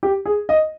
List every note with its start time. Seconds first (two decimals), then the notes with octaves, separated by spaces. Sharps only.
0.03 G4
0.25 G#4
0.49 D#5